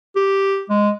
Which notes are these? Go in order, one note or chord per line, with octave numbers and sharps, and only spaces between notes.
G4
G#3